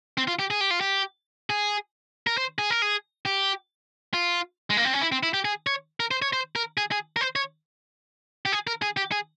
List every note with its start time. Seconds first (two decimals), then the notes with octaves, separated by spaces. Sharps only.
0.18 C4
0.28 F4
0.39 G4
0.50 G#4
0.61 G4
0.71 F4
0.81 G4
1.50 G#4
2.27 A#4
2.38 C5
2.58 G#4
2.70 A#4
2.82 G#4
3.25 G4
4.14 F4
4.70 G#3
4.77 A#3
4.85 C4
4.93 C#4
5.01 E4
5.12 C4
5.23 E4
5.34 G4
5.45 G#4
5.67 C#5
6.00 A#4
6.11 C5
6.22 C#5
6.33 C5
6.56 A#4
6.77 G#4
6.92 G#4
7.16 A#4
7.21 C5
7.36 C#5
8.45 G4
8.52 G#4
8.67 A#4
8.82 G#4
8.97 G4
9.12 G#4